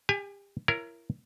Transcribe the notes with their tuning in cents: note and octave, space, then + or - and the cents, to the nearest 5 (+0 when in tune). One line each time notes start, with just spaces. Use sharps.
G4 +35 G#5 +0
E4 +35 A#4 +0 C#5 +0